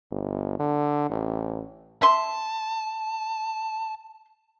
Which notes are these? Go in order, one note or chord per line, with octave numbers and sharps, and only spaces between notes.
G1
D3
A1
E5 A5 C6